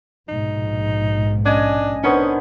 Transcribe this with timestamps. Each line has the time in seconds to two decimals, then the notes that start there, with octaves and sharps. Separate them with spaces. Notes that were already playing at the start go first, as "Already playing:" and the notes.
0.29 A#1 G#2 B2 D#4
1.46 C#4 D4 D#5 G#5
2.04 D#3 B3 C#4 D4 C5 C#6